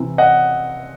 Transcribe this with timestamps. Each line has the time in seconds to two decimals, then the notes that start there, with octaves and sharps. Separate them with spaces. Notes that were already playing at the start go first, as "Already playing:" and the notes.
Already playing: C3 E3
0.18 D#5 F#5